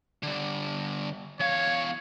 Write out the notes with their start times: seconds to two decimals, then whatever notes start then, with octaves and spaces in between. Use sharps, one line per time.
0.23 D3 G3
1.40 E2 C#5 F5